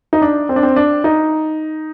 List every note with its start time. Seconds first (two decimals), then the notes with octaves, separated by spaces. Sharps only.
0.13 D#4
0.22 D4
0.49 C4
0.56 D4
0.63 C4
0.76 D4
1.04 D#4